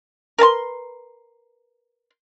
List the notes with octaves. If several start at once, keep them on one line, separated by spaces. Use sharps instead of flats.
A#4 B4 A5 C6